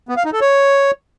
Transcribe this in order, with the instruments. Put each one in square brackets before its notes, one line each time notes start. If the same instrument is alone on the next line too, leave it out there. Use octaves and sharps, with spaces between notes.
[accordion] B3
F5
D#4
A4
C#5